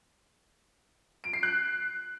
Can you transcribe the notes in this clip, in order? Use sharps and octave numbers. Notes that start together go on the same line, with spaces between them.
D7
C7
F#6